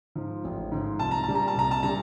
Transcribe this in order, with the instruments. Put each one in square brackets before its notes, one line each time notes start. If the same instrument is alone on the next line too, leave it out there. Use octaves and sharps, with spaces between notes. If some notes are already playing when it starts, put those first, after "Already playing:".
[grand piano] G#2 F3
A1
G#2 F3
C2 A5
A#5
A#2 G3 A5
A#5
A5
C2 A#5
A5
A#2 G3 A#5